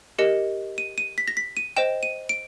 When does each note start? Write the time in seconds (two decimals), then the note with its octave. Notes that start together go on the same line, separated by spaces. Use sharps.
0.19 G4 A#4 D#5 C#7
0.78 D#7
0.98 D#7
1.18 B6
1.28 A#6
1.37 B6
1.57 D#7
1.76 C5 D#5 G5 E7
2.03 D#7
2.29 D7